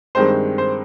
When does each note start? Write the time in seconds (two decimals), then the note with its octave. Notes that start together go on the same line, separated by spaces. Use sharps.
0.15 G2 D#3 G#3 C4 C5
0.58 C5